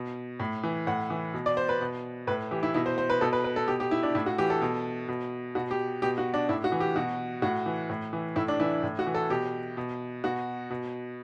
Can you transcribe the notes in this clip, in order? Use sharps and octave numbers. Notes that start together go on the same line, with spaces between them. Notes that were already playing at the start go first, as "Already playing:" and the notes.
Already playing: B2
A2
E3
A2 F#5
E3
B2
D5
C5
B4
B2
A2 B4
E3 G4
E4
B2 E4
C5
C5
B4
B2 A4
B4
B4
A4
B2 G4
G4
E4
D4
A2 E4
F#4
E3 G4
A4
B2
B2
B2 F#4
G4
B2 G4
F#4
D4
A2 E4
F#4
E3
G4
B2 F#4
A2 F#4
E3
A2
E3
A2 E4
D4
E3 E4
A2
F#4
E3
A4
B2 G4
B2
B2 F#4
B2